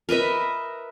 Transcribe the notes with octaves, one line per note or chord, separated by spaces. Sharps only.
A#4 B4 D#5 E5